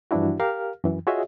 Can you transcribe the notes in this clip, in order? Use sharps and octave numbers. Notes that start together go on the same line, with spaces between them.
G2 E3 F3 D4 E4 F#4
G4 A#4 F5 F6
F#2 E3
F4 F#4 G#4 C#5 D#5 E5